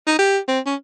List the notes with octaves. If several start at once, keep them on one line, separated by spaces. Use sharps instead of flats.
D#4
G4
C4
C#4